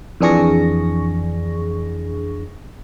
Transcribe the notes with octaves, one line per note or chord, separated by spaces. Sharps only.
F2 E3 D4 G#4 C#6 A#6